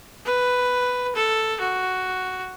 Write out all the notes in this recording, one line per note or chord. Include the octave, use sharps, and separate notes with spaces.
B4
A4
F#4